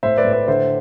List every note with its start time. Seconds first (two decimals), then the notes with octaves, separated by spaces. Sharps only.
0.03 A2 C5 E5
0.18 B4 D5
0.25 A2
0.33 B4 D5
0.47 D3 C5 E5